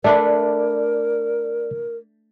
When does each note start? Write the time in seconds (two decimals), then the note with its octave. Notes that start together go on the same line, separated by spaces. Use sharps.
0.04 A3 D4 A#4 B4 D5